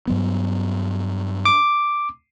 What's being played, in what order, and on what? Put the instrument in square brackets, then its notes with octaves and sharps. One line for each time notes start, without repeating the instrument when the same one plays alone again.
[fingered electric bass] G2 F#3 B3
[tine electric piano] D6